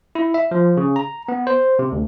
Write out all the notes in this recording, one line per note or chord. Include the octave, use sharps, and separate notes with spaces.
E4
E5
F3
C#3
A#5
B3
C5
C3
D2